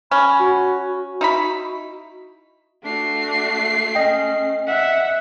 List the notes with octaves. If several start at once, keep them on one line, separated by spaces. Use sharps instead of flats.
C#4 B5
F#4
F#4
D#4 E4 B5
A3 D4 F#4 C7
C#4 D#5 G5
E5 F#5